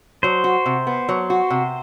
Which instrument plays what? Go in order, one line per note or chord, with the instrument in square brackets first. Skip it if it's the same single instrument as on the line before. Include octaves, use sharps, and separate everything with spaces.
[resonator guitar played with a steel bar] F#3 [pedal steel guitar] C5
[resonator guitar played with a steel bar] F#4
C3
B3
F#3
F#4
C3